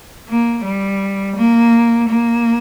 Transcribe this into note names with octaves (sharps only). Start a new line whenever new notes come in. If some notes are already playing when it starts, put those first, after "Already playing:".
A#3
G3
A#3
A#3